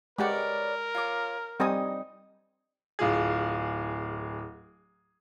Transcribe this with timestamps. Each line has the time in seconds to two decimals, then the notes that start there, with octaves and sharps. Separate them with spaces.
0.18 G#3 G4 A#4 B4 C#5 D5 F#5
0.95 F4 C#5 D6
1.60 G3 C4 D#4 G#5 D#6
2.99 D1 F4 G#4